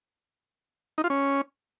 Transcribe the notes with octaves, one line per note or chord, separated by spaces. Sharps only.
D#4
F4
C#4